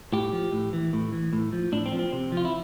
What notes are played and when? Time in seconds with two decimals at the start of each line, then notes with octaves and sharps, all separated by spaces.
0.13 A2 G4
0.32 F3
0.52 A2
0.73 E3
0.93 A2
1.12 E3
1.33 A2
1.53 F3
1.72 A2 D4
1.86 C4
1.92 F3
1.99 C4
2.12 C3
2.32 F3
2.37 F4
2.45 E4